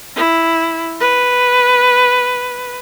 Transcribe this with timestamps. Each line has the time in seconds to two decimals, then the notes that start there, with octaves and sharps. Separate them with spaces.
0.16 E4
1.00 B4